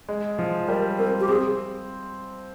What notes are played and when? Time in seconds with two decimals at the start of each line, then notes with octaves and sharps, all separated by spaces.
0.09 G#3
0.39 F3
0.68 G3 A#4
0.99 C4 A#4
1.20 G4
1.28 C4 G#4